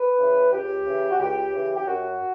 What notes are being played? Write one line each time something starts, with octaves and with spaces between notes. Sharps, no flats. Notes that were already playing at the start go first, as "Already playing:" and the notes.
Already playing: B4
C#3 E3
C#2 G4
C#3 E3
F#4
C#2 G4
C#3 E3
G4
F#2 F#4